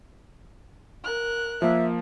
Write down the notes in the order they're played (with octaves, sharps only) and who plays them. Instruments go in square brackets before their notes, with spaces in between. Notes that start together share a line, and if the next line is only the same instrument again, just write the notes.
[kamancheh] A#4 F#6
[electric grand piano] F3 A#3 [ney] E5